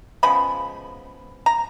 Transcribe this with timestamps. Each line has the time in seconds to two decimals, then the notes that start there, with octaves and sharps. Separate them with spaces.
0.23 C#3 F3 G#3 B3 B5
1.46 A#5